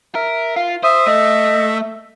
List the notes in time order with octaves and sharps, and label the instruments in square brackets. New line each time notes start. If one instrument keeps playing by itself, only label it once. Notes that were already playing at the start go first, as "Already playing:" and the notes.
[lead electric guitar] A#4 [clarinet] E5
[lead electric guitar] F4 [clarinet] F5
[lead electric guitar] C5 [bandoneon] E5 [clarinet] D#6
[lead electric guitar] A3 [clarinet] D#5